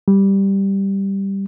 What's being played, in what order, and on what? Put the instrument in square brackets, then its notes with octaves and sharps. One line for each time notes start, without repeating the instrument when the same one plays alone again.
[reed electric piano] G3